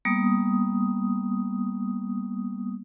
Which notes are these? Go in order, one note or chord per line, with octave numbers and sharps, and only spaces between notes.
G3 A#3 B3 D#6